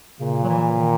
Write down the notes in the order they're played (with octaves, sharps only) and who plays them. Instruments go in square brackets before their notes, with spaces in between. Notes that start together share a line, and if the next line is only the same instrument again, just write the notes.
[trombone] A#2 [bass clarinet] C#3
[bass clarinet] F#3
E3
D#3